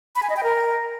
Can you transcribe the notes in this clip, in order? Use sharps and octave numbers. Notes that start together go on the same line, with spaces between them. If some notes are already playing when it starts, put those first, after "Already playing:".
B5
G#5
D#5
G5
A#4